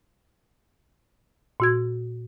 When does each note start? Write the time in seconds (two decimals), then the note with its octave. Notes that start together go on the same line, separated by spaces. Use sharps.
1.60 A#2 F#4 G#6